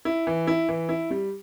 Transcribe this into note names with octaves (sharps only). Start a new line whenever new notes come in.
E4
E3
E4
E3
E4
G3